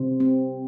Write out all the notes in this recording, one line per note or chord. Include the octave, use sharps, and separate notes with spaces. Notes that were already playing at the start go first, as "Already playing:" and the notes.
Already playing: C3 C5
C4